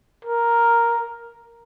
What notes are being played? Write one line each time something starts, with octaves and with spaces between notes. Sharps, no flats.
A#4